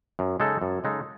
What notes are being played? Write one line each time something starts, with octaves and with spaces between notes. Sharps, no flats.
F#2
C#3 G#3 D#4 A4
F#2
C#3 G#3 D#4 A4